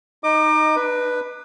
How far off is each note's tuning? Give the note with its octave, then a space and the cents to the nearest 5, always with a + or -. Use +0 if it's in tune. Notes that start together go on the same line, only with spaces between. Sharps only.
D#4 +0 D#5 -5 D6 +35
D4 +40 B4 +0